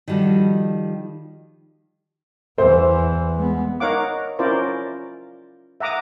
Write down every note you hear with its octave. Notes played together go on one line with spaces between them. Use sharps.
D#3 F3 G3 F#4 A4
E2 E3 C5
G#3 B3
D#4 A#4 C#5 F5 F#5 D6
C#4 E4 F4 A#4 C5 D5
E5 F#5 A#5 D6 D#6